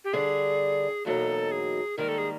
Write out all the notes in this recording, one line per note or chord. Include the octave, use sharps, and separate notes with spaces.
G4
G2 D3 G3 G#4
E2 B2 F#3 A#3 D#4 A4
G#4
G#2 D#3 G3 A#3 A#4
A4
G#4